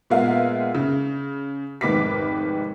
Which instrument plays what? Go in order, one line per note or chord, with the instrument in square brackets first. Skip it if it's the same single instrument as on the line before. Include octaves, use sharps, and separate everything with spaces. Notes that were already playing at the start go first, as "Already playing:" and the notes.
[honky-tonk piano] A#2 G#3 B3 A#4 E5 F5
C#3
F1 G#2 D#3 B4 D6 B6